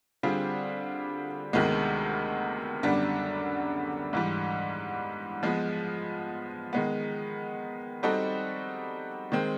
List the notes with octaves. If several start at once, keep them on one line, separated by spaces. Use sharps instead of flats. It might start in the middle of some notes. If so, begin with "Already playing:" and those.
D3 G3 C4 F4 G#4
D2 C3 D#3 G#3 B3
F#2 D3 G3 B3 D4
G#2 E3 G3
F3 G#3 B3
D#3 G#3 B3
G3 C4 D#4 F#4 A4
D#3 G#3 C4